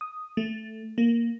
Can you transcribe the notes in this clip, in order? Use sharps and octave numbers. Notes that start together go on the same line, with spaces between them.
D#6
A3
A#3